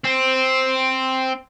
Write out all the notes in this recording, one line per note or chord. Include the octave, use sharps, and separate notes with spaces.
C4